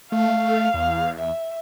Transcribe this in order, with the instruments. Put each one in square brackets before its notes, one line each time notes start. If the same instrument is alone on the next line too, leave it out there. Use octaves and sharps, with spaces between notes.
[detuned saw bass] A3 [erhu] F5
[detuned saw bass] E2
[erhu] E5